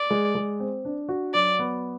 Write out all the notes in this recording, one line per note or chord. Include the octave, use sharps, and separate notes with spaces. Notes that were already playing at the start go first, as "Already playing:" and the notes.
Already playing: D5
G#3
G#3
C4
D4
F#4
F#3 D5
B3